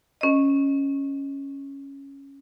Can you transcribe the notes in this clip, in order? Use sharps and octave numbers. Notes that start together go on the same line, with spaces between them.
C#4 D#5